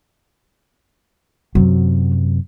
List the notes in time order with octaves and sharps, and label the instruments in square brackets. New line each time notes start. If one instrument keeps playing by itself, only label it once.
[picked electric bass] F#2 C3 [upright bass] F#3